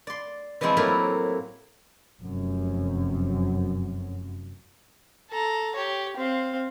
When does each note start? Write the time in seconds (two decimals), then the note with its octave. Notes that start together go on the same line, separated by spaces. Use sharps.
0.07 D5 C6
0.61 E3 F3 G#3 C4 E4
0.77 A2 F#3 A#3 E4 F4
2.20 F1 F#2
5.31 A4 A#5
5.75 G4 C#5
6.17 C4 F5